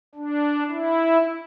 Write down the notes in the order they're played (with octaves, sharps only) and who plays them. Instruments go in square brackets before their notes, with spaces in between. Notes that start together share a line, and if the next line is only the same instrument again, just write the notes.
[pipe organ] D4
E4